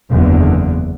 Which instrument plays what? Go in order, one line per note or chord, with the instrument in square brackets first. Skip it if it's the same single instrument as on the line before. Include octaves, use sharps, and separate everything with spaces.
[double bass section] F#1 E2 D3